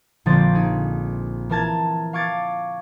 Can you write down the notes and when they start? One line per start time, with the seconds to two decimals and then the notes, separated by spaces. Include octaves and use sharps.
0.26 A#1 D3 F3 C4 D5 A6
0.54 D#4 G#4
1.49 E3 A#4 A5 G#6
2.13 F5 C#6 D6 G#6 A6